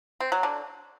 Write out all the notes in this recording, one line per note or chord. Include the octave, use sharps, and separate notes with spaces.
C4
F#3
D3